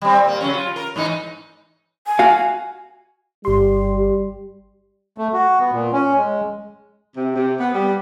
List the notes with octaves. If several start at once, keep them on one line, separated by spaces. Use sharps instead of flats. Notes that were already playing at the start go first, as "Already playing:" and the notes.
G3 C4
A#2 A#3
C#3 F#3 C#4
F4
A#4
G#2 E3 D#4
G#5
F#4 F5
G1 G3 G4 C6
A3
F#4
B3
A#2
C#4
G#3
C3
C3
B3
G3